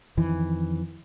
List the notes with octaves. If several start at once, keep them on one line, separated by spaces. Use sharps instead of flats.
F2 D#3 E3